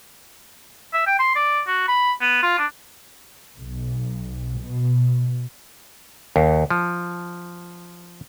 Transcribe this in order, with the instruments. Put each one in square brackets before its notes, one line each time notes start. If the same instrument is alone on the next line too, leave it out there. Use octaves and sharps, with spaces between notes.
[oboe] E5
G5
C6
D5
F#4
B5
B3
F4
D4
[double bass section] B1
B2
[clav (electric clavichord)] D#2
F3